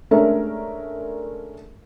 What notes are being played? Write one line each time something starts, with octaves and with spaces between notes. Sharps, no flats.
G#3 A3 C#4 D4 A#4 E5